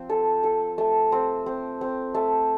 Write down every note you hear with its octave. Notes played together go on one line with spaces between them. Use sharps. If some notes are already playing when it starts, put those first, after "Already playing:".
Already playing: F3 C4
A4
A4
A3
C4
C4
C4
A3